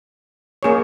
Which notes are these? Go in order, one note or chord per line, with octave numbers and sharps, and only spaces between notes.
A#3 C#4 G#4 C#5